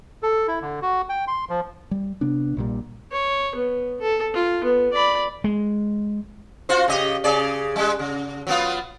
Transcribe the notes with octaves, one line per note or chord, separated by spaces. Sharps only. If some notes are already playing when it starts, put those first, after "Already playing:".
A4
E4
D3
F#4
G5
C6
F3
G3
C3 B3 D4
A#1 A#2 G3
C#5
B3
A4
F4
B3
D5 B5
G#3
F4 F#4 C5
C#3 G4 D#5
C#3 G#4 D5
G3 G#3
C#3
F#3 B3 F4